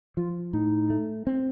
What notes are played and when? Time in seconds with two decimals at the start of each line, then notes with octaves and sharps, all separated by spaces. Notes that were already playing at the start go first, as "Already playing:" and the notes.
0.17 F3 F4
0.53 A2 D#4
0.90 A3
1.27 C4